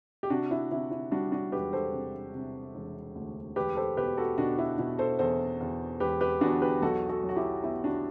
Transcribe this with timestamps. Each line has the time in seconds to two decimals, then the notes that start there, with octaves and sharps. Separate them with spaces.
0.23 G4
0.30 C3 D4 F#4
0.51 E4
0.71 C3 E4
0.91 E4
1.12 G3 D4 F#4
1.32 D4 F#4
1.52 E1 G4 B4
1.73 A4 C5
1.93 C3
2.34 C3
2.75 E1
3.15 D2
3.56 E1 G4 B4
3.77 A4 C5
3.97 B2 G4 B4
4.17 F#4 A4
4.38 B2 D4 F#4
4.58 E4
4.79 B2 E4
4.99 A4 C5
5.19 E2 A4 C5
5.61 E2
6.00 E1 G4 B4
6.21 G4 B4
6.41 E2 D4 F#4
6.62 G4 B4
6.82 B1 F#4 A4
7.09 F#4 A4
7.23 F#3
7.29 F#4
7.36 E4 G4
7.63 B3 E4 G4
7.84 D4 F#4